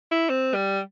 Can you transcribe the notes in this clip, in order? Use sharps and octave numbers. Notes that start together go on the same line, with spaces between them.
E4
C4
G3